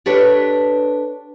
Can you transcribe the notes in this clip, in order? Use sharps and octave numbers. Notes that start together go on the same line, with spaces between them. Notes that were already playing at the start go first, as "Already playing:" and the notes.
D4 G4 A4 B4 C#5